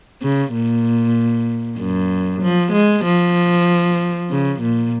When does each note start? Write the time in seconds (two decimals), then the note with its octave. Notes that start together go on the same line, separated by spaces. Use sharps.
0.22 C#3
0.53 A#2
1.79 F#2
2.42 F3
2.73 G#3
3.05 F3
4.30 C#3
4.62 A#2